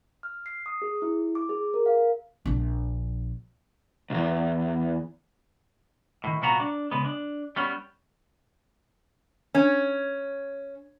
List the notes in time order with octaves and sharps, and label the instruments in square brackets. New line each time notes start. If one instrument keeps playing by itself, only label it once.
[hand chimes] F6
C7
D#6
G#4
E4
D6
G#4
A#4
F5
[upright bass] A#1 D4
[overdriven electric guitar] B1 E2
[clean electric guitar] A2 D#3
C2 A#2 B3 F#4 A#5
D4
C#3 G#3 B3
D4
G3 B3 C#4
[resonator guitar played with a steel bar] C#4